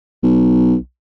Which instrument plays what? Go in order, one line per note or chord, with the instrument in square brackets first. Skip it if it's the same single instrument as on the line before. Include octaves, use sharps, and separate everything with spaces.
[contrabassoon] B1